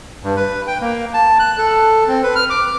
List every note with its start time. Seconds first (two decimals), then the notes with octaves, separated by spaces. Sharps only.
0.24 G2
0.36 B4
0.67 G5
0.81 A#3
1.14 A5
1.39 F#6
1.58 A4
2.08 C4
2.23 B4
2.35 F6
2.50 D6